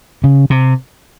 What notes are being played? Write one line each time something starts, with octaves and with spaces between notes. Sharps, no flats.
C#3
C3